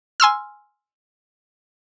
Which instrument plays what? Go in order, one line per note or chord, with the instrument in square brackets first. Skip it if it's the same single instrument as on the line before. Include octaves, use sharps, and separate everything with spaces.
[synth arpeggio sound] G#5 C6 E6 F6